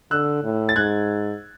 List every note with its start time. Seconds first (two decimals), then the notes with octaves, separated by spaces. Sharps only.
0.11 D3 E6 F#6
0.44 A2
0.69 A6
0.76 G#2 F#6 G#6